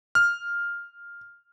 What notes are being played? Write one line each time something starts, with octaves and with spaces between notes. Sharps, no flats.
F6